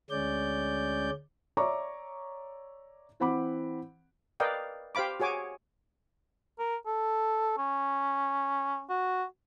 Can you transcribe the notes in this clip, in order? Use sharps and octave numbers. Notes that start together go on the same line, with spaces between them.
D2 G#3 C#4 D5 G6
C#5 D5 E5 A#5 C#6 D6
E3 C4 F#5 B5 D6
A#4 B4 D5 D#5 F5 G5
G4 C5 F5 B5 D6
F#4 G#4 C#5 G#5 D6
A#4
A4
C#4
F#4